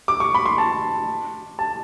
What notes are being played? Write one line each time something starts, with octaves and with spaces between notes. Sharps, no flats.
D6
C#6
B5
C6
A5
A5